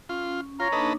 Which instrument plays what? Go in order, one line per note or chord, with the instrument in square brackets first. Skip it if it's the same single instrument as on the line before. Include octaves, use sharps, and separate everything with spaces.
[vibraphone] C#4 [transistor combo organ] F4
[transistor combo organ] F4 [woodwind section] C#5 A#5
[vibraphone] A#3 D4 D#4 [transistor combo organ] A4 B4 D#5